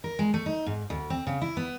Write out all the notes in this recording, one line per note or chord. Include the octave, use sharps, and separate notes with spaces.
A#4
G#3
A3
D#4
G#2
D2
C4
C#3
E4
B3